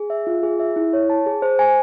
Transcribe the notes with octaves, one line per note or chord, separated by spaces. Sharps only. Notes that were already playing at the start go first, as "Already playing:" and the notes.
Already playing: G#4
E5
F4
G#4
E5
E4
C#5
A5
G#4
C5
G#5